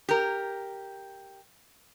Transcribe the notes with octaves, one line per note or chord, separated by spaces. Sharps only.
G4 A#4